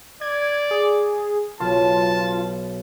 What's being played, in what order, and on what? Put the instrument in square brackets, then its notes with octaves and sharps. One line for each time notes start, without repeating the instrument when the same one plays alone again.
[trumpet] D5 [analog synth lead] G#6
[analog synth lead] G#4
[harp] B1 [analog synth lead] F4 [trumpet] A5